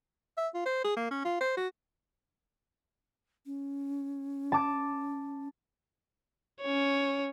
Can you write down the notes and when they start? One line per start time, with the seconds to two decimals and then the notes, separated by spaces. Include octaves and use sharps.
0.37 E5
0.54 F4
0.65 C5
0.84 G#4
0.96 A#3
1.11 C#4
1.25 F4
1.40 C5
1.57 F#4
3.46 C#4
4.52 A5 D6 A6
6.62 C#4 C#5